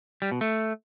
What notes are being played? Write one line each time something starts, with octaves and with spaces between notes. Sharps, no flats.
G3
B2
A3